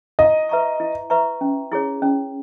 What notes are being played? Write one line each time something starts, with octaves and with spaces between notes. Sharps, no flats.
E4 D#5
B4 E5 A#5 C#6
E4
B4 E5 A#5 C#6
C#4
E4 G#4 C#5
C#4